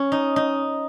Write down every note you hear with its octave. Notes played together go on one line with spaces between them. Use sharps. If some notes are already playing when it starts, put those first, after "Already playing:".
Already playing: C#4
D#4
D#4